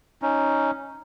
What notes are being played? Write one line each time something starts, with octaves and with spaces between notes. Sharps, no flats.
C#4 D#4